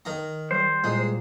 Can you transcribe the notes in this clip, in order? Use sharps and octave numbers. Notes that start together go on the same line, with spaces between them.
D#3 A#5
G3 C5
A#2 G#3